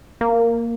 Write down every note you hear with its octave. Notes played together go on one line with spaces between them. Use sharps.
A#3